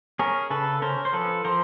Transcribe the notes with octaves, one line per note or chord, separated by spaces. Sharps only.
C#4 G#4 A#4
C#3 A4 B4
C#4 A#4 C5
C5
F3 A4 B4
F3 A#4 C5